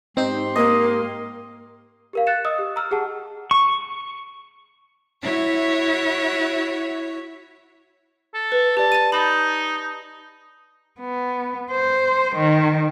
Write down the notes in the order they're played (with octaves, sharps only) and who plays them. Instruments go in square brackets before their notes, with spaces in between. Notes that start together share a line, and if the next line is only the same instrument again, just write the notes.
[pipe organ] G#2 G4 C6 [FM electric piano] C4 D#4 C5
[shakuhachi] A#3 [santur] D#5
[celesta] G4 A#4 F5
F#6 A6 C#7 E7
D#5 D#6 E6
G4
A#5 E6 F6
G4 G#4 F#5 A5
[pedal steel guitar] C#6
[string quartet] E4 F#4 C#5 E5
[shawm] A4
[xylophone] B4
[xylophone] G4 D5 [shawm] A5
[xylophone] A6 D#7
[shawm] D#4 [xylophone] A5 B5
[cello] B3
C5
D#3